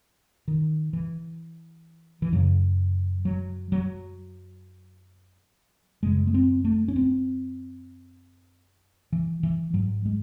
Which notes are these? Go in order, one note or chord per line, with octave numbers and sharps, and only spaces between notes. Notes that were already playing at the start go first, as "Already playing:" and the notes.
D#3
E3
E3
F#2 C#3 F#3
F#3
F#3
F#2 C#3 G#3
A3
C4
A3
C#4
C4
E3
E3
G#2 F#3
G#3